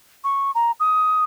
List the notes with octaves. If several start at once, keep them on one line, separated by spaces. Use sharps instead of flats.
C#6
A#5
D#6